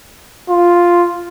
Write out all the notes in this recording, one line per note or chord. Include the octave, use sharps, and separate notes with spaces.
F4